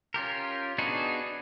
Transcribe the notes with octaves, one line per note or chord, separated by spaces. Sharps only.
C#4 F4 G4 A#4
B3 D4 D#4 F#4 G#4